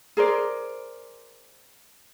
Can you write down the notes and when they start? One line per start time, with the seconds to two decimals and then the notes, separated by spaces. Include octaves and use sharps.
0.17 G#4 A#4 C5 D5